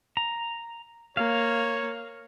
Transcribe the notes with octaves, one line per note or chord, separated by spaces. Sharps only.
A#5
A#3 C#5 F5